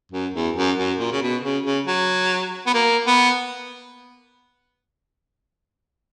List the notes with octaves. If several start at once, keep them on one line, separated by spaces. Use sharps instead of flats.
F#2
E2
F#2
F#2
A#2
C#3
B2
C#3
C#3
F#3
B3
A#3
B3